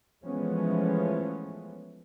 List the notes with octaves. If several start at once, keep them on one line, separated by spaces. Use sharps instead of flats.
E3 F3 G#3 A3 B3 C#4